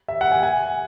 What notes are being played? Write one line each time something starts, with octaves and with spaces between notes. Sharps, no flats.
E5
F#5
G#5
G#5